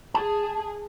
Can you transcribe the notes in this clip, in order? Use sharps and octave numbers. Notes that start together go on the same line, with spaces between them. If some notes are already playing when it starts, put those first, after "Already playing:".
G#4 A5